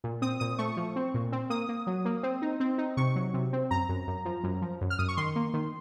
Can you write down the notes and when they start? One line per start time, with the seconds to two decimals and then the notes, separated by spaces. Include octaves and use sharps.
0.04 A#2
0.22 C4 D#6
0.40 A#2 D#6
0.59 A3 C#6
0.77 F3
0.96 C4
1.14 A#2
1.32 C4
1.50 A#3 D#6
1.69 A#3
1.87 F#3
2.05 A#3
2.23 C4
2.42 D#4
2.60 C4
2.78 D#4
2.97 C3 C#6
3.16 F#3
3.34 C3
3.53 C4
3.71 F#2 A#5
3.89 F#2
4.07 F#2
4.25 F3
4.44 F#2
4.62 F3
4.81 F#2
4.90 F6
4.99 F#2 D#6
5.08 C#6
5.17 D#3 C6
5.36 A#3
5.54 D#3